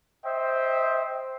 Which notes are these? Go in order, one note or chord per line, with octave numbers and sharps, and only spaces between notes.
C5 D#5 E5 G5